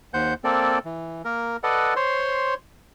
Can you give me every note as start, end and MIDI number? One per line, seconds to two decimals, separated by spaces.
0.14 0.34 39
0.14 0.34 72
0.14 0.34 78
0.14 0.34 91
0.44 0.78 58
0.44 0.78 60
0.44 0.78 69
0.44 0.78 74
0.85 1.22 52
1.25 1.57 58
1.25 1.57 70
1.63 1.94 69
1.63 1.94 71
1.63 1.94 74
1.63 1.94 75
1.63 1.94 78
1.96 2.54 72
1.96 2.54 73
1.96 2.54 84